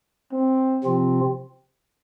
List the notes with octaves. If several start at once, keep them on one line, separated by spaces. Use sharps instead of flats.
C4
C3 F3 C4 F4